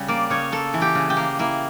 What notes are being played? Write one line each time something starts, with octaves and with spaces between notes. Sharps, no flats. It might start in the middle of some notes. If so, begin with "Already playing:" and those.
Already playing: C#3 G3
A#3 D5
C#3 C#5
A#3 A4
E3
G4
C#3
G4
A#3
A#3 E4